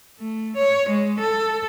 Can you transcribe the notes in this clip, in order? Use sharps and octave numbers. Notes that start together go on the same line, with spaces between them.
A3
C#5
G#3
A4